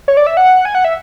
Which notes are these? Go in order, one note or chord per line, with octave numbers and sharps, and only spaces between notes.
C#5
D5
E5
F#5
G#5
F#5
E5